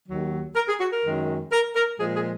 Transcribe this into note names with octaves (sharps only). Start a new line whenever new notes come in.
D#2 D#3 F#3
A#4
G#4
F#4
A#4
F#2 D#3 G#3
A#4
A#4
A#2 F3 G#3 G#4
G#4